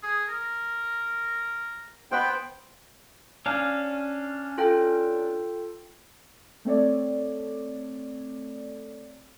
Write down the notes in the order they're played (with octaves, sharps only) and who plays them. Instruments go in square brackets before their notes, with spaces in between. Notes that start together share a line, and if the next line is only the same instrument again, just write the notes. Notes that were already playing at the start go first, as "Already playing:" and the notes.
[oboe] G#4
A#4
[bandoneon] B3 G5 [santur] C5 F#5 B5
[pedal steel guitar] C#4 D4 F5
[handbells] F4 A4 G5
[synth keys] A3 C4 A4 C#5 D5